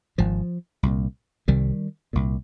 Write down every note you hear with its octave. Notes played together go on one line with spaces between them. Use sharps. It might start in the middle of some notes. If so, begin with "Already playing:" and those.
G#1 G#2 F3
C2 A#2
C2 C3 D#3 G3
C2 A#2